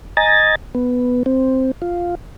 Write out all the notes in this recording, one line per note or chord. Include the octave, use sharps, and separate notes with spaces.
D#5 G#5 A#5 A6
B3
C4
F4